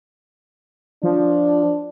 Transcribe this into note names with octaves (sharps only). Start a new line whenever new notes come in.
F3 D4